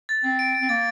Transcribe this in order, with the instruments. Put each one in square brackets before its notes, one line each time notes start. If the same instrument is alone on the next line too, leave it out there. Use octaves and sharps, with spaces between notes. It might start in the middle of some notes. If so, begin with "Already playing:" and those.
[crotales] A6
[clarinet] C4 [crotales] A6
[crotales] D7
A6
[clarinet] C4
[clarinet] A#3 [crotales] A6